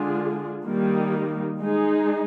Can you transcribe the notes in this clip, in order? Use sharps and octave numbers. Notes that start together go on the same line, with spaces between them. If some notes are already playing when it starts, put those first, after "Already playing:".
Already playing: D3 G#3 D4 F4 G#4
D#3 G3 A#3 D#4
G#3 D#4 G#4